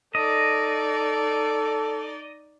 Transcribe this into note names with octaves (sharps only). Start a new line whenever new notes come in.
D#4 A4 D5 D#5